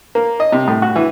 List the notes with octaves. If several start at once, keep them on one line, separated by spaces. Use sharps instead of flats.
A#3
D#5
C3
A2
F#4
E3